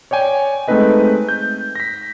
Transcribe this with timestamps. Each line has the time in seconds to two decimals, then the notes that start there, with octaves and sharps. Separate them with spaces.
0.11 C#5 D5 G5 G#5
0.68 G#3 A3 C4 D#4 B4 D#5
1.29 G6
1.76 A#6 B6